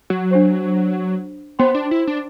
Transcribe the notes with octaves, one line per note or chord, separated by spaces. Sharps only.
F#3
D4 G4 C5
B3 F#4 C5 G5 C6
D4
E4
D4